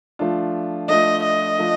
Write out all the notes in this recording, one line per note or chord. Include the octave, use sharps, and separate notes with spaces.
F3 A3 D4 F4
F3 A3 D4 F4 D#5
D#5
F3 A3 D4 F4